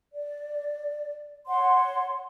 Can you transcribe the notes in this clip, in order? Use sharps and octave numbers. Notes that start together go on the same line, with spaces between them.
D5
C#5 F#5 C6